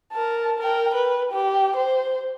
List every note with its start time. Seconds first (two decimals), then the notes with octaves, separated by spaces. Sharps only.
0.13 A#4 A5
0.59 A#4 G5
0.95 B4
1.32 G4
1.76 C5